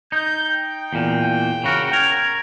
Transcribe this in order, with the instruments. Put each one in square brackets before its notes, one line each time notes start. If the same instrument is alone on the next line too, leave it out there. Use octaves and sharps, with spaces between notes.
[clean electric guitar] D#4 [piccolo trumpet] G6
[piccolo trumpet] G5
[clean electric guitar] E2 A#2
C#3 F#4 A#4
[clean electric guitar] A#4 [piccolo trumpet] G#6